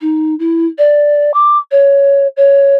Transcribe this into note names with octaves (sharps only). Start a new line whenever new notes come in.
D#4
E4
D5
D6
C#5
C#5